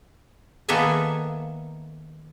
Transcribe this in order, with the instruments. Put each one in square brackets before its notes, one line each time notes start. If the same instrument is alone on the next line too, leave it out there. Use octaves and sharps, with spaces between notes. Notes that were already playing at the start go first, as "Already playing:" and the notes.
[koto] D#3 A#3 B3 A4 E5 G#5